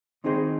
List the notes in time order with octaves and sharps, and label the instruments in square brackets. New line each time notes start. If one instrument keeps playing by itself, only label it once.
[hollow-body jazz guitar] D#3 C4 D#4 G#4 C5